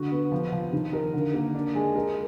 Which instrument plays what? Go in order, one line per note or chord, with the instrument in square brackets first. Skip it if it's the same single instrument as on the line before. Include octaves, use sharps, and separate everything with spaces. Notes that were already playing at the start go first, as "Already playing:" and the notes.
Already playing: [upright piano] D3 F#4
B3
F3
F3
D#3
A#4
D3
A#3
D4
G#3
A#4